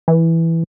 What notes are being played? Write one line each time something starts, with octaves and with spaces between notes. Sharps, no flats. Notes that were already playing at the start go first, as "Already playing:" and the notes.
E3